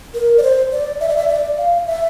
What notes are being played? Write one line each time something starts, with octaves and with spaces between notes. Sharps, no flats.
A#4
D5
C5
D5
E5
D5
E5
D5
F5
E5